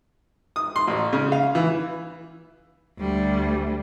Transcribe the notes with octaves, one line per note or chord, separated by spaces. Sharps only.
D#6
C6
A1
C#3
F5
E3
D2 G3